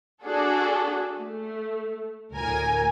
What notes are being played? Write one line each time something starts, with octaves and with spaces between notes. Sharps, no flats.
D4 F#4 G#4 A4 D5
A3
D2 A2 A#4 G#5